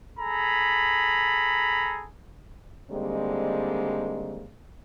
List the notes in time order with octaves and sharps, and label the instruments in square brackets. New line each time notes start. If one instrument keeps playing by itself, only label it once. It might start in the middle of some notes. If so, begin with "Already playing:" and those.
[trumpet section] G#4 A4 A#5 B5
[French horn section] D3 D#3 G3 G#3 A#3 C4